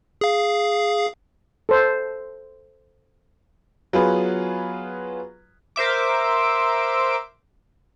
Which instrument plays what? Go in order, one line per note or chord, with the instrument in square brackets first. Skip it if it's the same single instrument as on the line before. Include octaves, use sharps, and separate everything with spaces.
[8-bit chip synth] G#4 F5
[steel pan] A4 C5
[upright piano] F#3 B3 F4 G#4 B4
[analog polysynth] A#4 C5 E5 D6